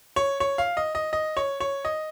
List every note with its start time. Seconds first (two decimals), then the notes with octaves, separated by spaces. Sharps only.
0.16 C#5
0.40 C#5
0.58 F5
0.77 D#5
0.95 D#5
1.13 D#5
1.37 C#5
1.60 C#5
1.85 D#5